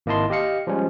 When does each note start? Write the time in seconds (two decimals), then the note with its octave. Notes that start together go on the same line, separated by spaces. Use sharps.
0.06 G#1 A#3 E4 D#5 A5 C6
0.30 G4 D#5 F5 C#7
0.67 F3 G3 G#3 C#4